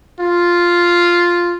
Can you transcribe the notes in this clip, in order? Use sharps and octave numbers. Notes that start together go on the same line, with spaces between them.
F4